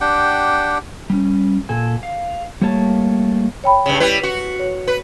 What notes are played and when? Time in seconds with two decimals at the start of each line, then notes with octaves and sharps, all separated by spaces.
0.01 D4 G4 F#5 G5
1.10 G3 C#4
1.69 A#2 A4 G#5
2.03 F5
2.61 G3 A3 A#3 C#5 A5
3.64 C#5 G5 B5
3.86 G2 C#3
4.00 G3 E4 B4
4.23 F#4
4.59 C#5
4.88 B4